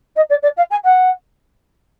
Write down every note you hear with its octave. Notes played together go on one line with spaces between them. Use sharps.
D#5
D5
D5
F5
G#5
F#5